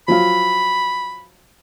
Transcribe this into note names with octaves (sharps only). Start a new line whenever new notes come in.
F3 F#3 F4 B5